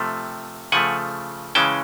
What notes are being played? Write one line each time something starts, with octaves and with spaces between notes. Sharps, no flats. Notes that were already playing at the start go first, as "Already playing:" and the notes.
Already playing: C3 F3 A3
C#3 F3 A3 F#5 G#5
C#3 E3 G#3 C#4 G5 A5